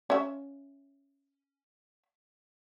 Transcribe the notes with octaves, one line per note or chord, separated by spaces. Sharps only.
C#4 E5